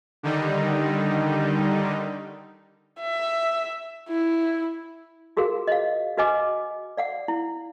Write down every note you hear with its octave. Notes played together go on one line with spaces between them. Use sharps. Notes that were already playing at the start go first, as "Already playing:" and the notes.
D3 D#3 G3 D#4
E5
E4
F4 F#4 G#4 A#4 F5
D#5 F5
F#4 B4 D#5 G#5 D6
D5 F5 F#5
E4